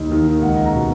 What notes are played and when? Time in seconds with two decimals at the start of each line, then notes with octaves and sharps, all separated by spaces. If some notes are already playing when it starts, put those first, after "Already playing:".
Already playing: D#2 D#3
0.11 D#3
0.41 C#2 F#5
0.65 A#5
0.72 B2